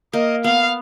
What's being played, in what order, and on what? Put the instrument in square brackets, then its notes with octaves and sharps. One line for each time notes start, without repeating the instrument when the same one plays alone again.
[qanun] A#3 [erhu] D#5
[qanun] B3 [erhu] F5